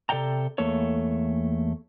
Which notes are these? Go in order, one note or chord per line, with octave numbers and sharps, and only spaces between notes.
C3 A4 D5 F#5 G5 A#5
E2 A3 A#3 A4 C#5